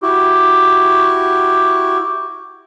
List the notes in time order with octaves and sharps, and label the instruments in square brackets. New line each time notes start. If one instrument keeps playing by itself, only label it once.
[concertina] E4 F#4 G4